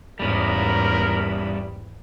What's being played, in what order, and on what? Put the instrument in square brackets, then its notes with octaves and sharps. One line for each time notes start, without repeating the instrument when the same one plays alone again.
[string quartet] E2 G#2 B5 [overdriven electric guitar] G3 C#4 [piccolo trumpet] A#4